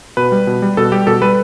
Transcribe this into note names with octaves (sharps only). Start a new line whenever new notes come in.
B2 B4
G3
B2
G3
B2 A4
G3 G4
B2 A4
G3 B4